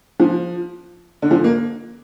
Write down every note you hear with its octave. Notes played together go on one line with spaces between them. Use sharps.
F3
D3
F3
A#3